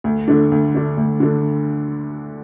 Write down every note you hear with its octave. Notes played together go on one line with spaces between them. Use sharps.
D2
D3 A3 D4
D2
D3 A3 D4
D2
D3 A3 D4